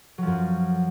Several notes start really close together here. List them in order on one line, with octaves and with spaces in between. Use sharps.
F#3 F3 F#2